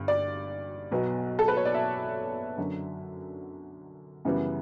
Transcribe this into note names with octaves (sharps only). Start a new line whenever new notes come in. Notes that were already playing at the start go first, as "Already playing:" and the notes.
Already playing: G1 G2
D5
B1 B2 F#3 B3
A4
B4
C#5
D5
E5
F#2 D3 F#3
F#2 C#3 E3 G3 B3